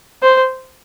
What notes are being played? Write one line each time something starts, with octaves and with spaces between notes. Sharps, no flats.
C5